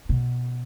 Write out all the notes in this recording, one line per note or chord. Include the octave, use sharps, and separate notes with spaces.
B2